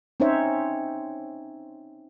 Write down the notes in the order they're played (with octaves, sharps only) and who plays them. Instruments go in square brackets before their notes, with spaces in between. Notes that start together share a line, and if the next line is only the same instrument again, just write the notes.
[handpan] C4 C#4 D#4 C5 C#5 E5